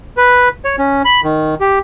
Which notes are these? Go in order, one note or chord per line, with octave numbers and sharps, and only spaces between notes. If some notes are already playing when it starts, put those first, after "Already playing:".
B4
C#5
C#4
B5
D#3
G4